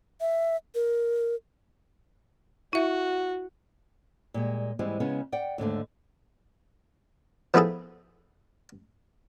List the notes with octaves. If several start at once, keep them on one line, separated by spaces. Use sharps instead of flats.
E5
A#4
E4 F#4 E5
A#2 G3 G#3
G#2 E3 G3 G#3 C4
C#3 G#3 B3 C#4
D5 F#5 G5
D#2 G#2 D3 A3
F3 B3 E4 G#4 A4